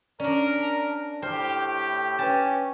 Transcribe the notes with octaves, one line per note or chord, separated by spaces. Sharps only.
C#4 D4 A#4 D5
A2 G4 C5 G5 F6
C#4 B4 G5 A5